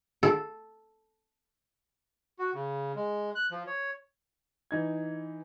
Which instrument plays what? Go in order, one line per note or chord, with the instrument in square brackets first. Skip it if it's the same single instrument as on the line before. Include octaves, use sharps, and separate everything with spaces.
[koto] A4
[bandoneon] F#4
C#3
G#3
F#6
F3
C#5
[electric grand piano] E3 D#4 G#6